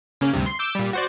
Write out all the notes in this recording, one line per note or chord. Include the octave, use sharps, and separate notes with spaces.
C#3 A#3 C#4
D2 G2 C3
C6
D6 E6 G6
A#2 G3
F#4 C5 D5